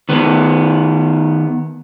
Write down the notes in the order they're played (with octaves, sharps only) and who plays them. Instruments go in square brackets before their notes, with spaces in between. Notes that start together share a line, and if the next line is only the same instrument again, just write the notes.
[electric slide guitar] D#3 B3